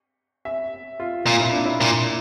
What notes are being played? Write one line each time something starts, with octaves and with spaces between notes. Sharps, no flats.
E5
F4
A#2 F4
E4
D4
E4
A#2